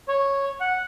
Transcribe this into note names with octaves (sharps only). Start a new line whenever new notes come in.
C#5
F#5